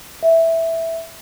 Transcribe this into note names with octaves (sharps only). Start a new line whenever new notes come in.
E5